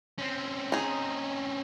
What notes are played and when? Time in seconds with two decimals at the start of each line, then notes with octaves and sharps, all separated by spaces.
0.19 C4 C#4
0.72 D#4 G#4